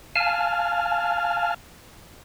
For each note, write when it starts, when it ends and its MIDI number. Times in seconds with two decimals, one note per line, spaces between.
0.15 1.54 77
0.15 1.54 80
0.15 1.54 81
0.15 1.54 89